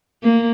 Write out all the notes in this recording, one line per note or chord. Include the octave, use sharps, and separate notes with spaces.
A#3